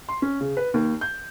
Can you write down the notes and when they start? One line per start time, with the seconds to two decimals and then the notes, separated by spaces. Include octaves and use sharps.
0.09 C6
0.22 C#4
0.41 C#3
0.57 B4
0.74 D#2
1.01 G6